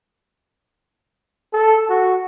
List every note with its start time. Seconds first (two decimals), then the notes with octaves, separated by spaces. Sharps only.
1.53 A4
1.89 F#4